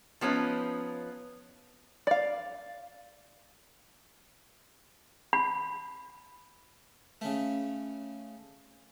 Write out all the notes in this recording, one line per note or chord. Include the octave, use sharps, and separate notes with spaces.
F3 B3 C#4 D#4
D5 F5
B5
C#3 A3